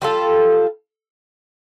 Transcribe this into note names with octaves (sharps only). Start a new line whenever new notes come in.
G3 F4 A4